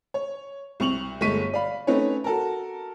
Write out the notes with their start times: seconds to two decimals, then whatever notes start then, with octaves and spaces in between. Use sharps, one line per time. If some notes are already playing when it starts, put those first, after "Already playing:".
0.14 C#5
0.80 C2 C4 C#6 F7 F#7
1.21 G1 G#3 A3 C#6 B6 D#7
1.54 D5 F5 B5
1.87 A3 C4 C#4 D#4 B4 C#5
2.24 F#4 A4 A#4